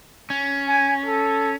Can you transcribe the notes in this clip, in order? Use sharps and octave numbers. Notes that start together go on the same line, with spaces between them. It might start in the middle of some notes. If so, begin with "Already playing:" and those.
C#4
G#5
A4